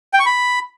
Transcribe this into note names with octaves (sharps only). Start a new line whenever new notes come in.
G5
C#6
B5